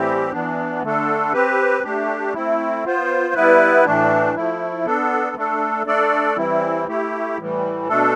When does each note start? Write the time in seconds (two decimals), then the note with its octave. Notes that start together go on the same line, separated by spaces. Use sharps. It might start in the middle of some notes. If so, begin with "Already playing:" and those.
Already playing: A2 E3 G3 C4 G4
0.32 E3 B3 D4
0.82 D3 A3 D4 A4
1.33 C4 G4 B4
1.83 A3 D4 G4
2.34 A3 C4 E4
2.84 B3 F4 C5
3.35 G3 B3 E4 B4
3.85 A2 E3 A3 D4
4.36 F3 A3 E4
4.86 B3 D4 A4
5.36 A3 D4 A4
5.87 A3 D4 A4 D5
6.37 E3 G3 C4 E4
6.87 A3 E4 G4
7.38 A2 E3 G3
7.88 B2 A3 D4 A4